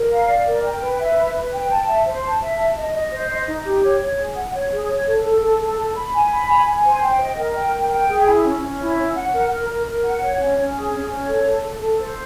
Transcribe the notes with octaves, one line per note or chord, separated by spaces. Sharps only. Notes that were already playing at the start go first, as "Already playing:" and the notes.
Already playing: A#4
F5
D5
A#4
G5
B4
E5
B4
B4
G5
A5
E5
C5
A5
E5
A5
D#5
D#5
C5
D#5
D#4
G4
C#5
C#5
G#4
F#5
C#5
G#4
C#5
A4
A4
A4
A4
A4
B5
G#5
B5
G#5
G#5
C5
G5
D#5
A#4
G5
A#4
G5
G#4
E4
C#4
C#4
E4
C#4
F#5
A#4
A#4
A#4
A#4
F#5
C#5
C#4
C#4
G#4
C#4
C#5
A4
A4
A4
A4
C5